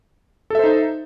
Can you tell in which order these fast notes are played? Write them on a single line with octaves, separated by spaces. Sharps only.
A4 E5 C5 D#4